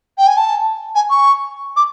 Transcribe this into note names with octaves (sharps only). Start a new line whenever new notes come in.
G5
G#5
A5
G#5
C#6
D6